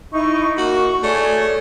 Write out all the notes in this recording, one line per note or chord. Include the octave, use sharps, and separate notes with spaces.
D#4 E4 C#6
A#3 F#4 C#6
A3 G#4 C#5 D5